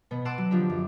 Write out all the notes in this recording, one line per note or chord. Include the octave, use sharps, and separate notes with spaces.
B2 B3
F#5 A5 C6 D6 E6 D7
F#3
D3 F3 D4 G4
F#2